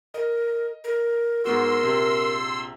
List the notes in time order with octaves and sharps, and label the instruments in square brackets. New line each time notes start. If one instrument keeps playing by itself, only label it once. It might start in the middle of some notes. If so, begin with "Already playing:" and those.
[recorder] A#4 [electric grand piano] D#5
[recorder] A#4
[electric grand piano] G#2 B3 F#4 [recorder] A#4 [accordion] C6 E6
[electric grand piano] A#1 C3